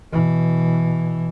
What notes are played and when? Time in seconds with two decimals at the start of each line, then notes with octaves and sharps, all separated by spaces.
0.12 B2 E3